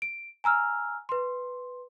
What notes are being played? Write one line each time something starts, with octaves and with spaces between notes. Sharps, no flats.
D7
G#5 A#5 E6 F6
B4 C6